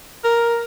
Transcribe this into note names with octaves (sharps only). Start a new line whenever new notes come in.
A#4